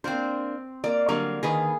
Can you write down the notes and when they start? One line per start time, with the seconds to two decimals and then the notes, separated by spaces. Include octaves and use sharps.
0.04 A#3 C4 D4 C5
0.84 A#3 D5
1.09 D3 F#3 G3 A#3
1.43 D3 D#3 G#4 B4